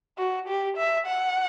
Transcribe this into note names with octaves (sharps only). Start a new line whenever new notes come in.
F#4
G4
E5
F#5